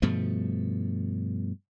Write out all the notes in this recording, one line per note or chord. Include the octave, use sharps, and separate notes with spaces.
G2 B2 F3 A3